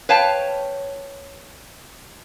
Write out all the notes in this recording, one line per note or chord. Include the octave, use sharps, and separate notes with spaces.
B4 C#5 F5 G5 A5